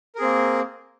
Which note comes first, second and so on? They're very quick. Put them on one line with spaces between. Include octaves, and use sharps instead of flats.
A#4 G#4 C4 A#3